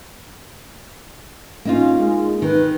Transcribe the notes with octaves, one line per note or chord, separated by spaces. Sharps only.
A#3 C#4 D#4 F4
G#3
D#3 B4